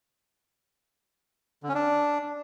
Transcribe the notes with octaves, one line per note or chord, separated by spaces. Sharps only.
D3
C#4
D4